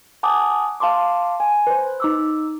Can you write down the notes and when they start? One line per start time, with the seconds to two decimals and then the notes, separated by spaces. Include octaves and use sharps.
0.23 F#5 G#5 A5 D6 D#6
0.80 F5 A5 C6 D6
1.40 G#5
1.67 B4 C5
2.00 D#4 D6 E6